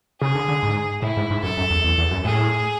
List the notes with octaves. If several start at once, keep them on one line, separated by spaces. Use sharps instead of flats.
C#3 G#4
D3
D3
G#2
A2 E4
G#2
G#2
F#2 A4
F#2
E2
E2
E2
F#2
A2 G#4